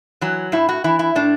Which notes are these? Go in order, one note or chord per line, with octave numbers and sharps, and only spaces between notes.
E3 F#3
A2 E4
F#4
E3 E4
E4
A2 D4